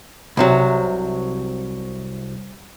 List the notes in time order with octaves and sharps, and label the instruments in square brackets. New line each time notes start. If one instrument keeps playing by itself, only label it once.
[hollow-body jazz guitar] C2 C3 F#3